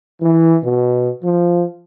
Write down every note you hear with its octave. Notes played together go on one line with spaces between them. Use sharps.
E3
B2
F3